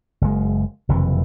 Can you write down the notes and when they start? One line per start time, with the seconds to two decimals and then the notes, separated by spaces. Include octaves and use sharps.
0.21 F#1 G#3
0.89 F#1 F2 C3 E3